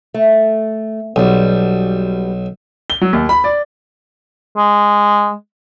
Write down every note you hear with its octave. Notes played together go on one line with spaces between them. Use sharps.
A3
B1 B2 G3
G7
F#3
D#2
B5
D5
G#3